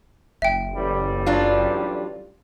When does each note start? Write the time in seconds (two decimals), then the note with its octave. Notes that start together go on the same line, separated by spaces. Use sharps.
0.42 F#1 E5 G5
0.76 A1 G3
1.26 F#3 D4 F4